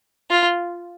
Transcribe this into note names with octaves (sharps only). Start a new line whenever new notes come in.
F4